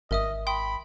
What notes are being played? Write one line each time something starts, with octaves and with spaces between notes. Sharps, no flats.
G#1 A#4 D#5 E5 D#6
G5 B5 C6 D#6